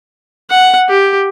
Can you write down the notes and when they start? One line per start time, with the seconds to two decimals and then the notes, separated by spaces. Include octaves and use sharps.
0.50 F#5
0.89 G4